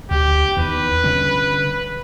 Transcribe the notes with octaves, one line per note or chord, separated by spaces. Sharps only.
D2 G4
E2 D#3 B4
D3 G3 C#4